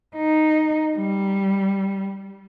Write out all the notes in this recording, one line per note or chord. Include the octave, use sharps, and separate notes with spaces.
D#4
G3